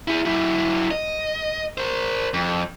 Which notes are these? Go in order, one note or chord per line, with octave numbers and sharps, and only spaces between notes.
E4 G#4
F#3 E4
D#5
A#4 C5
F2